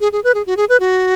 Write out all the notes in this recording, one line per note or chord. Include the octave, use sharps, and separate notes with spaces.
G#4
G#4
B4
G#4
F#4
G#4
B4
F#4